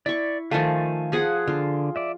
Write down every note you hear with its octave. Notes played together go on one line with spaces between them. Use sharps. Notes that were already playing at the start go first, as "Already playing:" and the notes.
E4 D5 C#6
D#3 F3 A3 F5 G#5 A5
F3 G#4 F#5
D3 F4
D5 E5